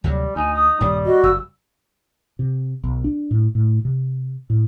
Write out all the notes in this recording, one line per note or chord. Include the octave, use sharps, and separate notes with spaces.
D2 C3 F#3 G3
D2 D#4 G#5
D#6
D#1 G2 G3
F#4 D#5
F#1 E6
C3
B1
D4
A2
A2
C3
A2